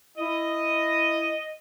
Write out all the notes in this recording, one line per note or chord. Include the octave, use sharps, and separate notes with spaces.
E4 D#5 D#6